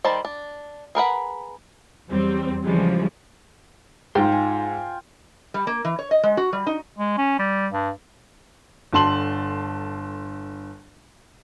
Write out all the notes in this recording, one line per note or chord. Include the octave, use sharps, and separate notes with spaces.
D#3 G3 C5 A5
D4
G#4 A#4 B4 F#5
E2 F#3 G3 C4
C#3 E3 F3 G3 G#3
G#2 D#4 F4 G5 C6
G#5
G3
A#3
E3
C#5
D#5
G#3
F#4
G3
D#4
G#3
C#4
G3
G2
G1 D3 A5 C6 F#7